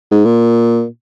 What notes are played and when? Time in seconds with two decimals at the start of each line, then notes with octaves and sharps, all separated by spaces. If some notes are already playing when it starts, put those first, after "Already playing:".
0.11 G#2
0.25 A#2